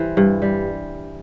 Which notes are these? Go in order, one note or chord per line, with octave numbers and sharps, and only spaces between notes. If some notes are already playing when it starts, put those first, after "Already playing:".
Already playing: E3 G3 C5
G2
G3